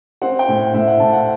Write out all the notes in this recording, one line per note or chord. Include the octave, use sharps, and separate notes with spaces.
C4 F#5
G5
A2
A2 E5
F#5
A2 A5
F#5